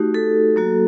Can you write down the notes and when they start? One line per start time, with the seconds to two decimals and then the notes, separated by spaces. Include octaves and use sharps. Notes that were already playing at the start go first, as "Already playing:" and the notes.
Already playing: A3 D#4 F#4 G4
0.14 A4
0.56 F#3 A#3 F#4